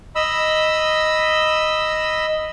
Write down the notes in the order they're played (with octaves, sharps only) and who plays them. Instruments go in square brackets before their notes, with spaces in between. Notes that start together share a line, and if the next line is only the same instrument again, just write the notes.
[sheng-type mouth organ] D#5 B5 E6